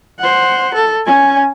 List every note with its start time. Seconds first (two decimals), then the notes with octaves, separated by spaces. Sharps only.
0.20 C5 F#5
0.75 A4
1.06 C#4 G#5